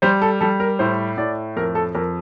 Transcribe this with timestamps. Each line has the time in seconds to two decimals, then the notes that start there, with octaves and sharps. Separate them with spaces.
0.02 G3 C5
0.22 A4
0.40 G3 A4
0.60 A#4
0.79 A2 C5
1.18 A2 D5
1.57 F2 A#4
1.75 A4
1.94 F2 A#4